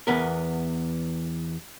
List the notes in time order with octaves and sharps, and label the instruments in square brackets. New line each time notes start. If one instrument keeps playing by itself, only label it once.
[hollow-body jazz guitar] E2 B3 A#4